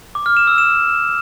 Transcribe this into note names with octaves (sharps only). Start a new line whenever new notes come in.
D6
F6
E7
E6
E7